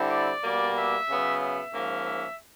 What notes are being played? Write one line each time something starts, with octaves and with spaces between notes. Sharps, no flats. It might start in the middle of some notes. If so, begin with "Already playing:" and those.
Already playing: D3 G3 C4 E4
D5
B2 G3 A#3
E5
C#3 F#3 B3
E5
G#2 F3 A#3 C#4
E5